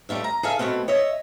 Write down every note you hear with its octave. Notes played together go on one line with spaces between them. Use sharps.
G3 A3 F4 E5
A#5
G#4 A4 E5 F5
B2 F#3 A3 B3 C4
C#5 D#5 E5